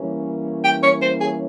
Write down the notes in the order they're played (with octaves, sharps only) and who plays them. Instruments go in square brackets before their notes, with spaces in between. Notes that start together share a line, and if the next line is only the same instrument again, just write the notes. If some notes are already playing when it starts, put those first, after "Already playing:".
Already playing: [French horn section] E3 G3 A#3 C#4
[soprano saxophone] G5
C#5
C5
G#4